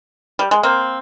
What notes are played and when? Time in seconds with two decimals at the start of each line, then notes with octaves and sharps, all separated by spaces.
0.39 G3
0.51 G#3
0.63 A#3 C4